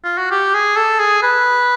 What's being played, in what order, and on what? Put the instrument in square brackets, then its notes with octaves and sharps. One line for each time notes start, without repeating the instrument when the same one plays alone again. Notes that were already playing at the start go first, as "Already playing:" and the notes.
[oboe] F4
F#4
G4
G#4
A4
G#4
B4